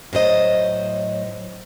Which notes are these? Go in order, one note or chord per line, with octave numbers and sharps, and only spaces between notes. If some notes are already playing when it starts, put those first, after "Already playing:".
A2 F#3 C5 D#5